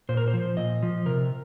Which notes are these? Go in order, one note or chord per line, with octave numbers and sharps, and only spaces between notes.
A#2 C5
A#4
C5
F3
A#2 D#5
F3
C3 A#4